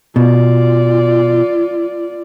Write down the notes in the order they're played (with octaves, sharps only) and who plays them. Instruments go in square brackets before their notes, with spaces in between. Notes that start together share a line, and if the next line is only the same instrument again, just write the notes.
[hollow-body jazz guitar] B2 [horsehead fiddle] F4 D5